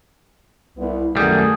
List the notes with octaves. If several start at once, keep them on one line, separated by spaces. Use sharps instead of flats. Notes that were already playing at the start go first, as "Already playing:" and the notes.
C2 B3 E4
F#2 D#3 G3 A3 B3 G4 G#4